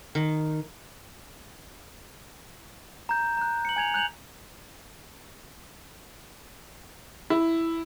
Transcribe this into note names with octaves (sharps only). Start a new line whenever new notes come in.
D#3
A#5 G6
A#5 F#6
C#7 F#7
G#5 G#6 F7
F#6 G6 F7 F#7
E4